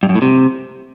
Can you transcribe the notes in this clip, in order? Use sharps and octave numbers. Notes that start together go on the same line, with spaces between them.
G2
F#2
A2
C3